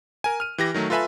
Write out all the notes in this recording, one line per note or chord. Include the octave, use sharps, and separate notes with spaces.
A#4 G#5
F6 D#7
E3 G4 A#6
D#3 F#3 A3
F4 A4 B4 E5 G#5 B5